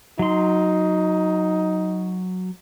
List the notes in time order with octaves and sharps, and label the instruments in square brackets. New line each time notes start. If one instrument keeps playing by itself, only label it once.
[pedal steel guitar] F#3 C6 [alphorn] D#4